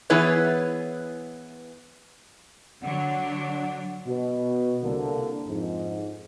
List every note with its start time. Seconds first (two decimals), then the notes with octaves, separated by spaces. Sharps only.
0.10 E3 B3 E4 G#4 B4 C#5
2.83 D3 F#3 D4 F#5
4.06 B2
4.82 C2 D3 A#3
5.47 F2 G#2